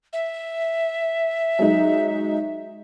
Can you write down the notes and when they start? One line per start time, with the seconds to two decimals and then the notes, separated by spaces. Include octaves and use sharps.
0.13 E5
1.59 F#3 G#3 D#4